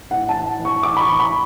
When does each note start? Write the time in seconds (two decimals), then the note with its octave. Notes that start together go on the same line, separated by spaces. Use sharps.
0.11 A2 F#5
0.29 A5
0.35 E3
0.59 E3
0.65 C#6
0.83 A2 D6
0.97 B5
1.01 C#6
1.08 E3
1.19 B5